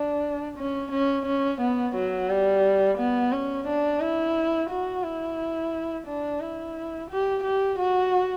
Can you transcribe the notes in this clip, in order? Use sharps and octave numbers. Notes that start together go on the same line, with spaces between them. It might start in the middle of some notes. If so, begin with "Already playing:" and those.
Already playing: D4
C#4
C#4
C#4
B3
F#3
G3
B3
C#4
D4
E4
F#4
E4
D4
E4
G4
G4
F#4